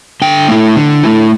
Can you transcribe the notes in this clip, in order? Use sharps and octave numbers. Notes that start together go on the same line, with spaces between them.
D3 G5
A3 E4
D3
A3 E4